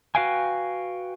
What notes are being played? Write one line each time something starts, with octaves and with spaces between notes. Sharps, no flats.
F#4 B4 F5 G5 G#5